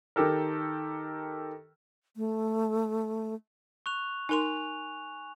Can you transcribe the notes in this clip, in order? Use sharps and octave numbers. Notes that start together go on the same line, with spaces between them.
D#3 G4 A4 A#4
A3
C#6 F#6 F7
D#4 A#4 G#5 C6 F7